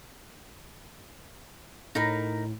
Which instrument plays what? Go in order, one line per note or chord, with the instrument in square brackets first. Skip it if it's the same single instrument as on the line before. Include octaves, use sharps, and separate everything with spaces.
[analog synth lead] A2 [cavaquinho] D#4 A#4 B5